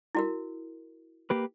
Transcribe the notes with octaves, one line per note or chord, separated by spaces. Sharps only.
E4 F#4 A#4
A#3 G4 B4